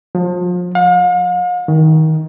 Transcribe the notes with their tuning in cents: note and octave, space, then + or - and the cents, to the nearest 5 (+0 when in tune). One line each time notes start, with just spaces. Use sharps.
F3 +35
F5 +45
D#3 +20